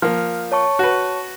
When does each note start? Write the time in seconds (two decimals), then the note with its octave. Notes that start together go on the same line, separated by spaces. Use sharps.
0.02 F3 A#3 F6
0.52 C#5 A5 C#6
0.79 F#4 B4